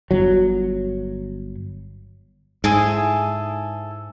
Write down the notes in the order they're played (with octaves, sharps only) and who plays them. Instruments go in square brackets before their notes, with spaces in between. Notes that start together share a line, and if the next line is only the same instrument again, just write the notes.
[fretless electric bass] G1 F#3
[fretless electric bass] G#2 [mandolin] E4 G#4 A4